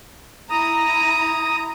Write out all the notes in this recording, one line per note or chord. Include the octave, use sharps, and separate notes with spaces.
E4 A#5 D#6